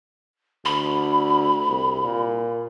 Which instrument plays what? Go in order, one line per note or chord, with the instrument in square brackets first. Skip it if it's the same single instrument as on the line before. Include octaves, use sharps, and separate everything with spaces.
[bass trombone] D2 [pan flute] B5
[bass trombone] C2
A#2